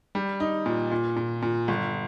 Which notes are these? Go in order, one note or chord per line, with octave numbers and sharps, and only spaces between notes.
G3
D#4
A#2
A#2
A#2
A#2
G1